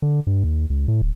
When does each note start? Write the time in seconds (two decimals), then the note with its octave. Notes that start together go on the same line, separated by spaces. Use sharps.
0.02 D3
0.27 G2
0.44 D#2
0.70 C#2
0.88 A2
1.02 D1